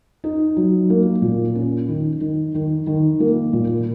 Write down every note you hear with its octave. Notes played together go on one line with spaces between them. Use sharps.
D#4
F#3
A#3
A#2
C#4
D#3
D#3
D#3
D#3
A#3
A#2